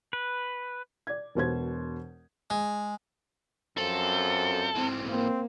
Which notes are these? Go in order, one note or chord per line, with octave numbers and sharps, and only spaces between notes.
B4
D5 G#6
E1 B2 C5 G#6
G#3
F#2 C4 F4 A4
G#2 E3 C4
A#3 C4